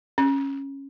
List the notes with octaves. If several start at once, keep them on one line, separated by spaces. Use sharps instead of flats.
C#4